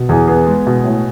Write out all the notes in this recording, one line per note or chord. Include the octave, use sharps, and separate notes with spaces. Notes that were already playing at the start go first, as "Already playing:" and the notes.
Already playing: B2
E2 G#4
B3 G#4
G#3
B2
A2